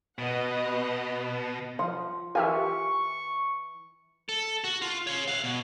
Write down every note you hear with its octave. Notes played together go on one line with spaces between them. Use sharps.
B2 B4 D#5 F#5
F3 F#5 C6
E3 F4 G4 A#4 E5 G#5 C#6
A4
F#4
F4
C#5 F5
F5 F#5
B2